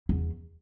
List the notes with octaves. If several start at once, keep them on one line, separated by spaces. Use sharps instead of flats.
E2